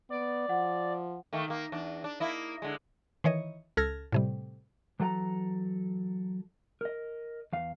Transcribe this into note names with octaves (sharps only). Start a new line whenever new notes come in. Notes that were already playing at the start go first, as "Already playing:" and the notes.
B3 D5
F3 F#5
D#3 A3 A#3
D#3 A#3
E2 D4
D4
A#3 E4 D#5
D3 G#3
D#3 E3 C#5 D#5
C#2 A4 F6 G#6 A#6
A2 C3 G3
E3 F#3 A4 G5 A#5
A#4 D#5
E2 F5